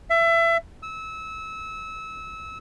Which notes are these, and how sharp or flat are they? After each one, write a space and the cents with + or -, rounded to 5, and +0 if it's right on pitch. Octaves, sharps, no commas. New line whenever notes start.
E5 +25
E6 -25